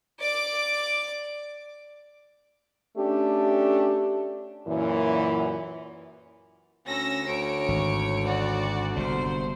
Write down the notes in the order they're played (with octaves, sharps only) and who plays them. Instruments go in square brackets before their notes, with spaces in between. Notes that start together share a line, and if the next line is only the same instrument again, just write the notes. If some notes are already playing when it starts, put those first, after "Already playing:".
[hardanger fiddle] D5 D6
[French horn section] A3 C#4 D4 G4
F#2 A#2 E3
[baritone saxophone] D2 [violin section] C#4 E6 A#6
[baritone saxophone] D2 [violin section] C#5 D7
[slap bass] G#1
[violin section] F#4 D5
[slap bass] G1 C3 [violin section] C5